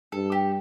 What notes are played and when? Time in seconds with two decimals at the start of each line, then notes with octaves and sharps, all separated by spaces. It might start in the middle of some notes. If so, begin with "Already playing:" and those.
0.12 G2 A4
0.32 G4